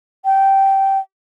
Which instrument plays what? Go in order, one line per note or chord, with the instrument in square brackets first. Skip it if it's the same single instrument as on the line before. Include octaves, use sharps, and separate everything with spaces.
[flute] G5